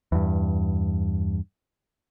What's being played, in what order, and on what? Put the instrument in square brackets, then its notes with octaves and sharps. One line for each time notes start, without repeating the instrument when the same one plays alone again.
[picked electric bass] E2 G2